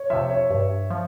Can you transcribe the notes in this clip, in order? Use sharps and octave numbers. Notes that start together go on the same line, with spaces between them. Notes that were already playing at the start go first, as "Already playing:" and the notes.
Already playing: C#5
C3 F3 E5
C#5
G2
F3